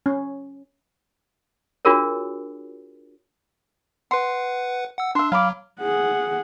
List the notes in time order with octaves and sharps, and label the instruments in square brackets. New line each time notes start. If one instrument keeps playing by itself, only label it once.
[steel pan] C#4
[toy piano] D4 F4 F#4 G#4 A#4 C#5
[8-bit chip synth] B4 F#5 [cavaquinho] C6
[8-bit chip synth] F#5 E6
[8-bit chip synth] D4 [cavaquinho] E5 C6
[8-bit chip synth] F#3 [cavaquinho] F5 B5 D6
[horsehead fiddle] G#4 F#5